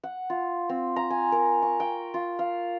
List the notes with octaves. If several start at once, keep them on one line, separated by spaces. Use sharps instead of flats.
F#5
F4
C4
A#5
G#5
A#4
C#6
G5
F4
F5